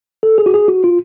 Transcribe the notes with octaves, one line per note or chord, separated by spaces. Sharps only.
A4
G#4
F#4
G#4
F#4
F4